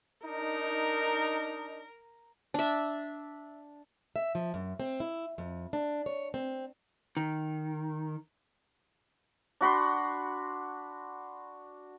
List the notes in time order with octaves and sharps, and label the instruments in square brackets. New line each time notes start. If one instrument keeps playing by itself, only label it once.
[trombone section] D4 D#4 [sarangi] A#4
[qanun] D4 E5
[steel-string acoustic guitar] E5
F3
F#2
C4
E4
F2
D4
C#5
C4
[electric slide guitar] D#3
[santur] D4 F#4 B5 C6